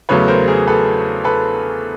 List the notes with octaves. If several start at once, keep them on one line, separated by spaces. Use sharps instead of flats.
E2 C#3 F#3 A3 B4 C#5
A#4 C5
G#4 A#4
A4 B4
A4 B4